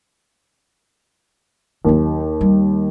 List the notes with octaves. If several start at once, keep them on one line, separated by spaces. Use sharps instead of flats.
D#2 F#3 D#4
G3